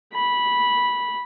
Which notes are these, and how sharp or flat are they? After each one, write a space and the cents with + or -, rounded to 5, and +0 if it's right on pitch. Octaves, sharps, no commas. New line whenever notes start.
B5 -10